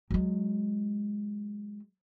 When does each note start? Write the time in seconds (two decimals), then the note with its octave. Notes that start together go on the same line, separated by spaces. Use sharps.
0.10 F#3 G#3